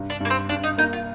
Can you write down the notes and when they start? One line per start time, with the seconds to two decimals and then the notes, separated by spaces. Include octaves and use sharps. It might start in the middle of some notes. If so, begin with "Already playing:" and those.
Already playing: G2 C3
0.10 D4
0.20 G2 A#3
0.30 C4
0.49 G2 D4
0.63 D#4
0.78 A#3 D#4
0.93 F4